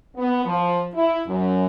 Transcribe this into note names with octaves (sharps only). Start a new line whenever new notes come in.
B3
F3
E4
F#2